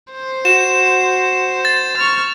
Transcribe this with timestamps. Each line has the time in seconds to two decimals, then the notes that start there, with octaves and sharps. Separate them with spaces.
0.12 C5
0.45 F#4 E7
1.65 A6
1.96 C#6 F6